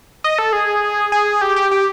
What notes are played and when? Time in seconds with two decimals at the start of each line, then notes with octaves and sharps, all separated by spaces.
0.24 D#5
0.39 A4
0.53 G#4
1.12 G#4
1.41 G4
1.56 G4
1.71 G4